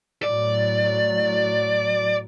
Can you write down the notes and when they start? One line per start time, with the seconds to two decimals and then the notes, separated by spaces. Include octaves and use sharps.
0.23 A2 F#3 D5